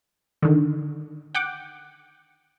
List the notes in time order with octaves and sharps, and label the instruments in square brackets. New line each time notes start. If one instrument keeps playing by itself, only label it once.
[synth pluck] D3 D#3
F#5 G5 D6